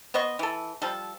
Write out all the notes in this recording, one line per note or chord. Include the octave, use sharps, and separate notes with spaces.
B3 C5 D#5 C#6
E3 A4
F3 G3 A4